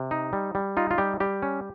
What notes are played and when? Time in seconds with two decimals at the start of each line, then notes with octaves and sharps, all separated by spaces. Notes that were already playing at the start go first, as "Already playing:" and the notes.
Already playing: C3
0.11 D#4
0.33 G3
0.55 G3
0.77 D#4 F4
0.91 F4
0.98 G3 G4
1.20 G3 G4
1.42 C#4